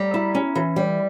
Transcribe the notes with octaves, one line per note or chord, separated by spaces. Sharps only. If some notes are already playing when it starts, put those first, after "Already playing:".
Already playing: G3 A#5
E4
C#4
E3
G3